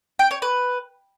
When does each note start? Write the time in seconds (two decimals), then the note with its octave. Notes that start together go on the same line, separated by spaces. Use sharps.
0.19 G5
0.31 C#5
0.42 B4